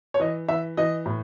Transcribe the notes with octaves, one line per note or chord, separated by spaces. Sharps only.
C#5
E3 D#5
E3 E5
E3 D#5
A2